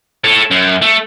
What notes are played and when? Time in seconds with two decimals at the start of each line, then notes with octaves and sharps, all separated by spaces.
0.24 A4 C#5
0.51 F#2
0.82 A3